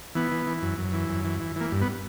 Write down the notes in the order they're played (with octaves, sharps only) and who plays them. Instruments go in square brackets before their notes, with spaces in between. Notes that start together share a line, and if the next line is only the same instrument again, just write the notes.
[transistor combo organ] E3 B3
E3
E3
F#2
F#2
E3
F#2
E3
E3
E3 A#3
G2
B3